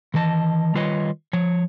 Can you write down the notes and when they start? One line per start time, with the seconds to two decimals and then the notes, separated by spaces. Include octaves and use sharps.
0.14 D#3 E3 D#5 A5
0.74 D#3 G3 F4 B4 C#5 D#5
1.33 F3 C#5